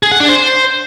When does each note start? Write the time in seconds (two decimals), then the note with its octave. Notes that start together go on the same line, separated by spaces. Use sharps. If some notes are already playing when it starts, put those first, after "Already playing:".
0.03 G#4
0.12 F#5
0.20 D4
0.29 C5